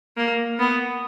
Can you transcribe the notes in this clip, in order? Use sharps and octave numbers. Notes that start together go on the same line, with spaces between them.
A#3
B3